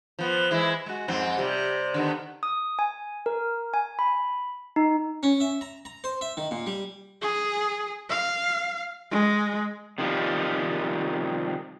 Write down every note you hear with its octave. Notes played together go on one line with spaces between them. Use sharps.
F3 B3
E3 G#3 E4
G#3 F#4
F2 G#2 C4
C3 G3
D3 D#3 B3
D#6
G#5
A#4
G#5
B5
D#4
C#4
E5
A#5
A#5
C5
E5
D#3
A#2
G3
G#4
F5
G#3
C3 D#3 F3 G3